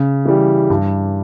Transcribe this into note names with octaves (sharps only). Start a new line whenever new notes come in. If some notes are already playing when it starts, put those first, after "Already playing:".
Already playing: C#3
E3 G3
G2